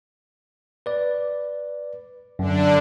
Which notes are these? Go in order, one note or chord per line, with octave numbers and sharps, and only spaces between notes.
B4 D5
F#2 D3 D4